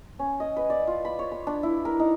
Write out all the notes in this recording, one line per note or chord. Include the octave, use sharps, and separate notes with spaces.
C#4
D#5
B4
D5
F4
B5
C#5
B5
D4
E4
A#4
D#4